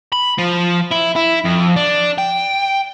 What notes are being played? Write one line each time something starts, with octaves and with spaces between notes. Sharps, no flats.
B5
F3
E4
E4
F2
D4
G5